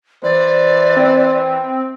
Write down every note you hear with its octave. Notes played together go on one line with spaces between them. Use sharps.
E3 C5 D5
C4